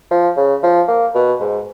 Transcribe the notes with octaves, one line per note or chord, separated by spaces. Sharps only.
F3
C#3
F3
A#3
B2
G#2